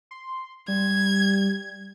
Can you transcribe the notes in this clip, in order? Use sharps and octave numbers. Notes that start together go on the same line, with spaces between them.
C6
G3 G#6